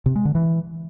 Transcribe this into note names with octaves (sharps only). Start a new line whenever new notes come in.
C3
G#3
D3
E3